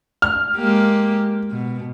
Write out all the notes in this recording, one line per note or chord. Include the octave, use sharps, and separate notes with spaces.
F6
G#3 A#3 G4
B2